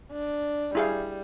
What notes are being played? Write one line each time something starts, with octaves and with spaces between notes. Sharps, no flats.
D4
G3 E4 G#4 F5